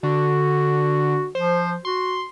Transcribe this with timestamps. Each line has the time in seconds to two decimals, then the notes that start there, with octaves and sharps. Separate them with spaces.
0.03 D3 F#4
1.35 F3 C5
1.85 F#4 C6